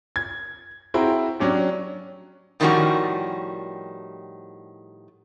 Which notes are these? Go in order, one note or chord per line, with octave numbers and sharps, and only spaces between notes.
G#6
C4 E4 F#4 G#4 G5 A#5
F#3 C#4 D4 G4
A2 D#3 F3 G3 C#4 F#4